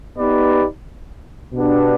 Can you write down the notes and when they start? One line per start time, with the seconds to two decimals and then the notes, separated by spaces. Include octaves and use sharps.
0.18 B3 D#4 G4 B4 D5
1.53 B2 B3 D4 G4